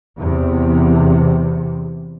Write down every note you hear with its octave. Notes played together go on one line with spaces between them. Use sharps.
E2 C3